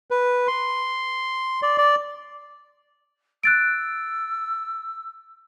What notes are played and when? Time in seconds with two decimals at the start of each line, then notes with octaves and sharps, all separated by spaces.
0.11 B4
0.48 C6
1.62 D5
1.78 D5
3.43 E6 F#6 A6 D7